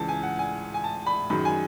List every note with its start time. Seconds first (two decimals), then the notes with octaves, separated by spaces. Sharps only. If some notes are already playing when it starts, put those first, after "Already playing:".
Already playing: C#2 C#3 E3 A5
0.08 G#5
0.23 F#5
0.39 G#5
0.74 G#5
0.84 A5
1.06 B5
1.30 F#2 D#3 G#3 B5
1.45 G#5